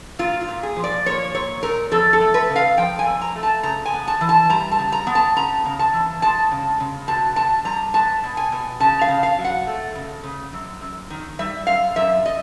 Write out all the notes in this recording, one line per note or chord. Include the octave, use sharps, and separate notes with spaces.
A#2 F4
F4
A#2
G#4
F3
D5
A#3 C#5
A#2 C#5
A#2 A#4
F2 A4
A4
A3
B4
C#3
F5
F3 G5
G#5
F2
A#5
A3
A5
C#3 A#5
G#5
B3
A5
E3
A5
G3 A#5
A5
C#3
A#5
B3
A5
C#3 A#5
C#3
A5
E3
G#3 A5
C#3
C#3
B2 A5
B2 A5
G3 A#5
B3 A5
B2
G#5
B2
C#3 A5
F5
C#3
F5
F#3
F#5
A3
C#3
C#3
F#2
F#2
D#3
G3 E5
F#2 F5
F#2 E5
D#5